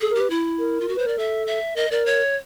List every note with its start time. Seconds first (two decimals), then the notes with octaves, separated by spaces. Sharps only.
0.01 G#4 A4
0.10 A#4
0.15 G4
0.20 B4
0.30 E4
0.59 A#4
0.81 F4
0.88 F#4
0.95 B4 C5
1.06 A#4 D5
1.18 A4 E5
1.47 E5
1.76 A#4 D#5
1.91 A#4 D5
2.06 C#5